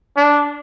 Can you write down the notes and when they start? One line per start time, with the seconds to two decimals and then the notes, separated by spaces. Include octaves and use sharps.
0.17 D4